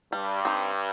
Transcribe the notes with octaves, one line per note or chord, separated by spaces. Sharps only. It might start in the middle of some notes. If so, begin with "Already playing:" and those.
G2 G3
C4 D#4